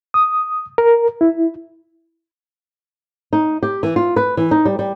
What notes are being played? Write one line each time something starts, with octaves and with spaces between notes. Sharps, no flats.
D#6
A#4
E4
D#4
G4
E3
F4
B4
E3
D#4
G3
G3